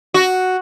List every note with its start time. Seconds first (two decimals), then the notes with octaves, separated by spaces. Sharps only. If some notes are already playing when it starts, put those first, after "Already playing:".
0.14 F#4